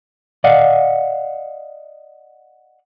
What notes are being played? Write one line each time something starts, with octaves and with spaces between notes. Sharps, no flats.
D5 D#5 F5 F#5